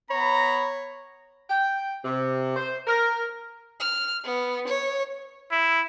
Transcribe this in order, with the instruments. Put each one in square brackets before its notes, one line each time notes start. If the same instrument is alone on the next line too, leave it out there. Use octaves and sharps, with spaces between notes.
[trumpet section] B3 A#5 B5 [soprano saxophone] C#5
[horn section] G5
C3
C5
A#4
[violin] F6
B3
C#5
[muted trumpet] E4